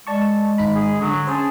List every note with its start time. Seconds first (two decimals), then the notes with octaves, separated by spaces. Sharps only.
0.07 G#3 D5 A5 C#6
0.58 G#1 D#4 B5
0.76 G#4
1.01 D3 F#3
1.27 C#4 G#4 C5 G#5 A5